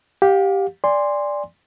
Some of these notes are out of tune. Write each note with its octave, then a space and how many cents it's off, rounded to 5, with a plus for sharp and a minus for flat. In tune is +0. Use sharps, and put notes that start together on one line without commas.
G4 +0 F5 +35
D5 +0 G#5 -30 C6 +0